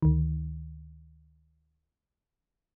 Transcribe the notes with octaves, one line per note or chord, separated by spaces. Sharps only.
D2 D#3